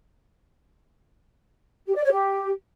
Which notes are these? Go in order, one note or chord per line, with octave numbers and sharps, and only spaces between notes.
G4
D5
C#5
G4